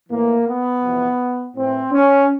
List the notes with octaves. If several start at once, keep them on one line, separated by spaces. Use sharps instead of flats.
A2 E3 A#3
B3
F2 C3 E3
A2 E3 C4
C#4